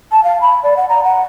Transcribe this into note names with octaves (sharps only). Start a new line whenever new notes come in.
A5
F5
B5
D5
F#5
A#5
F#5